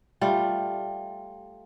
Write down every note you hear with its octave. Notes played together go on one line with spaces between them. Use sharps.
G3 A3 F4